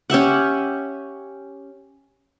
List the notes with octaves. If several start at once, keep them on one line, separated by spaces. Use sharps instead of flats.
C#4 G4 E5 F#5